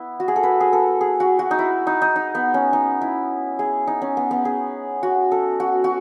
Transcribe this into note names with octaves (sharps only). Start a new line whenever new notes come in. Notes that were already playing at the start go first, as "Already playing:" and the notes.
Already playing: B3 E4
F#4
G#4
A4
B4
G#4
A4
G#4
F#4
F#4
D#4
E4
D#4
D#4
D#4
B3
C#4
D#4
E4
G#4
D#4
C#4
B3
B3
G#4
F#4
A4
F#4
F#4